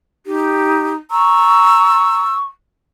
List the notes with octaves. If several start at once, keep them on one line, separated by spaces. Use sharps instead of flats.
D#4 G4
A#5 C#6 E6